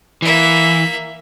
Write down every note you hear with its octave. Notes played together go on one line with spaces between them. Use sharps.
E3 A#3 E5